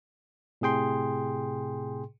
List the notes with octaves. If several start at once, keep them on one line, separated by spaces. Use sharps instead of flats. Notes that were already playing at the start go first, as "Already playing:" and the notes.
A2 C3 G#4 G5 C6